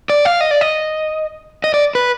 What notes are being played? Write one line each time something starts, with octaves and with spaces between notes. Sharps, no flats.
D5
F5
D#5
D5
D#5
D#5
D5
B4